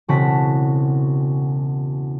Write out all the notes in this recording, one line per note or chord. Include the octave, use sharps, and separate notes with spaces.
E1 C#3 C4 F#4 A5 B6